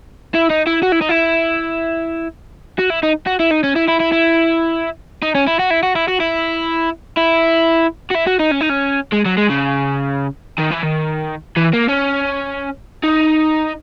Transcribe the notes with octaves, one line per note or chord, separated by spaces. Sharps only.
E4
D#4
E4
F#4
E4
D#4
E4
F#4
E4
D#4
F#4
E4
D#4
C#4
E4
E4
E4
E4
D#4
C#4
E4
F#4
E4
F#4
E4
F#4
E4
E4
F#4
E4
F#4
D#4
C#4
D#4
C#4
G#3
F#3
G#3
C#3
D#3
E3
D#3
E3
A#3
C#4
D#4